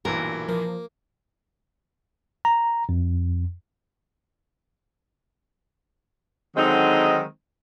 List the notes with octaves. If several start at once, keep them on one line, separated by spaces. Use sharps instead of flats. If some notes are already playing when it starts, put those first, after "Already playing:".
B1 G2 A#2 E3 A#4
F3 A#3
A#5
F2
D3 D#3 F#3 G#3 C4 D#4